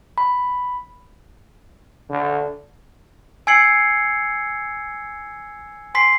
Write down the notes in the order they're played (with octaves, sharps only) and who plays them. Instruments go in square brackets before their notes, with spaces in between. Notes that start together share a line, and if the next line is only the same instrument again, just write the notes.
[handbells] B5
[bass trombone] D3
[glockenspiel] G#5 E6 G#6 C7 C#7 F#7
G#5 C6 B6 C7